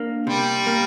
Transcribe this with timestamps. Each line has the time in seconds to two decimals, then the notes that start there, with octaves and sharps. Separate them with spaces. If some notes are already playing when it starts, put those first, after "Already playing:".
Already playing: A#3 D4
0.27 C3 G3
0.67 A#3